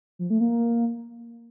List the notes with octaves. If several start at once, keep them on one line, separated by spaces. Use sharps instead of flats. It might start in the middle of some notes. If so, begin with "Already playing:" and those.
F3
A3
A#3